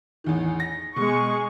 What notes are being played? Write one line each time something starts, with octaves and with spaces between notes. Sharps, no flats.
A1 E2 D#3
A#6
B2 G#3 C#6